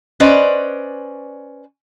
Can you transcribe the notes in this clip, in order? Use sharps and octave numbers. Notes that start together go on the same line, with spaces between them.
C#4 B4 C5 D5 D#5